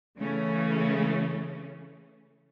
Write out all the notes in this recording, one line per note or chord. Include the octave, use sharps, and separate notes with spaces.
C#3 E3 A3 C#4